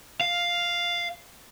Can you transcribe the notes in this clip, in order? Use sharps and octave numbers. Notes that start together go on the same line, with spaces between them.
F5